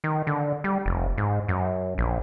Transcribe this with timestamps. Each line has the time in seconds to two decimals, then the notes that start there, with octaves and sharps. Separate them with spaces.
0.04 D#3
0.27 D3
0.64 G3
0.86 F1
1.18 G#2
1.48 F#2
1.98 A#1